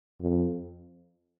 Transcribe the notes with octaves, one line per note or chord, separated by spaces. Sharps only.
F2